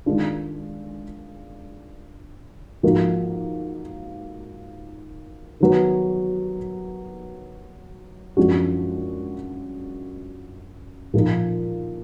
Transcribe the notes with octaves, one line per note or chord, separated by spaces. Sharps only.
D#3 G#3 D4 F4
G#2 F3 A#3 D#4 F#4
D#3 F#3 B3
F#2 F3 G#3 D4 F#4
A#2 F3 A#3 D#4